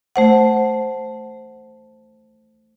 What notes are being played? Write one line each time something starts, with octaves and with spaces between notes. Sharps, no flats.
A3 C5 F#5